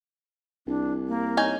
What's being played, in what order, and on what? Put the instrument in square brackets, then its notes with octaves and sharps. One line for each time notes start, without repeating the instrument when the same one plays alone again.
[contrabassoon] C2 [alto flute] D4
[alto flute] A#3
[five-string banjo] C#4 D#4 G#5